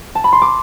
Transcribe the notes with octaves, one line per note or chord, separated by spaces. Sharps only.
A5
B5
C6
D6